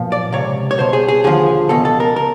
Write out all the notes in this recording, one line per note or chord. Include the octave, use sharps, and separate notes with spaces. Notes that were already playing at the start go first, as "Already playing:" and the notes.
Already playing: B1 A#2 F3
D5
C#2 C3 C#5
C#5
C2 B2 C5
G#4
G#4
D#2 D3 F3 G#4
C#2 B2 A4
A4
A#4
A#4